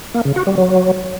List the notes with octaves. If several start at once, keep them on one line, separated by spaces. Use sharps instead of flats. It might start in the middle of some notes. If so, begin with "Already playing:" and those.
A#3
C#3
F#4
G3
F#3